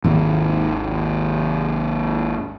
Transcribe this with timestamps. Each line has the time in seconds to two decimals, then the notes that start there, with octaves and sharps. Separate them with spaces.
0.04 G#1 D#2